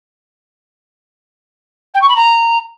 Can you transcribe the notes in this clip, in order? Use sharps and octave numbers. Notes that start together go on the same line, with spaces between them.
G5
C#6
B5
A#5